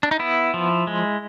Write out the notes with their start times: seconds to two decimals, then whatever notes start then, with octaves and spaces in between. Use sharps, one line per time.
0.03 D4
0.11 D#4
0.19 B3 E4
0.54 F3
0.87 G#3